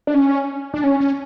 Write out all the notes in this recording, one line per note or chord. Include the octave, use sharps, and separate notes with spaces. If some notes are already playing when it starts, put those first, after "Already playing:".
D4
C#4
D4
C#4
C#4